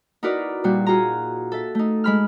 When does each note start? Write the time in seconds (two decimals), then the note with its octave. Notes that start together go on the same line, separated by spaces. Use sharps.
0.23 D#4 E4 F#4 A#4 B4 D5
0.64 A#2 G3 F#4
0.86 F4 F#4 G#4 A#5
1.52 A4 E5
1.75 A3 D#4
2.04 G#3 B5 F6